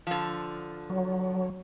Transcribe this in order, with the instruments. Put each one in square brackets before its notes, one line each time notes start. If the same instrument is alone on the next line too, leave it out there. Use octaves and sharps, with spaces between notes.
[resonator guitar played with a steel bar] D3 F3
[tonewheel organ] F#3